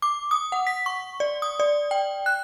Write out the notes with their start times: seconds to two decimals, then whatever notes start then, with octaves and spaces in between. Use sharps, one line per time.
0.02 D6
0.31 D#6
0.52 F#5
0.67 B6
0.86 C#6
1.20 D5
1.42 D#6
1.60 D5
1.91 G5
2.26 F#6